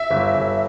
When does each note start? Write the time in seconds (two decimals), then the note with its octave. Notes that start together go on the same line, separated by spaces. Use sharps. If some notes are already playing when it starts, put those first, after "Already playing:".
Already playing: E5
0.10 G1
0.34 G1